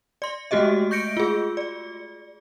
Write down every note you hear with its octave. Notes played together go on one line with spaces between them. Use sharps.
D5 C6
G#3 A3 F#4 G4 D#5 E5
C#6 G6 A#6 C#7 D7
F4 G#4
D5